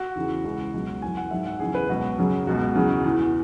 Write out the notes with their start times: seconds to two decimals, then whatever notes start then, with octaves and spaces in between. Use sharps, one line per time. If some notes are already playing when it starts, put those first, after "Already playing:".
Already playing: F#4
0.15 E2 C#3 E3
0.44 C#2 C#3 E3 F#4
0.73 C#2 B2 F#3
1.02 F#2 E3 G#5
1.17 F#5
1.31 G#2 F#3 E5
1.46 F#5
1.60 E2 C#3 F#3 G#4
1.75 B4
1.89 C#2 B2 F#3 F#4
2.18 F#2 C#3 F#3
2.47 C#2 B2 F#3 F#4
2.75 E2 C#3 F#3
3.04 E2 E3